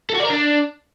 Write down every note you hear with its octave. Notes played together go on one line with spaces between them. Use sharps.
A4
F#4
D5
A#4
D4